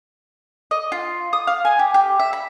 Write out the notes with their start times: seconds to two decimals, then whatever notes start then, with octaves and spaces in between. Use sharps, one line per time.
0.71 D#5
0.92 F4
1.33 D#6
1.47 F5
1.65 G#5
1.79 G4
1.94 G4
2.19 E5
2.33 B5